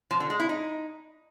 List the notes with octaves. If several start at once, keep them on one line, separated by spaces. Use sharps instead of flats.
F3
D3
G#3
E4
D#4